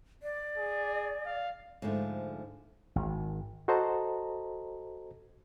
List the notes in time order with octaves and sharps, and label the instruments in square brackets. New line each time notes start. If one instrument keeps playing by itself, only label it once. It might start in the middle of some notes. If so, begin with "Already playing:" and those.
[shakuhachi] D5
[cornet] G#4
F5
[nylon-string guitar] G#2 D3 F3 G#3 A3
[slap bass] G#1
[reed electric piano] F#4 A4 C5 D#5 A5 A#5